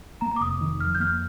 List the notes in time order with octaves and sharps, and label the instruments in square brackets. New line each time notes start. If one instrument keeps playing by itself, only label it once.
[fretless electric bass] A#3 [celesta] A#5
[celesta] A#5
D6
[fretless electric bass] F1 [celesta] D#6
[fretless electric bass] D#3
[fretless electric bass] F2 [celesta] F6
[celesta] G6
[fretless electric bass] A#3 [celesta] F6